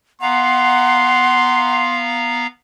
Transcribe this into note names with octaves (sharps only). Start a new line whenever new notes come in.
B3 F5 F#5 A#5 C6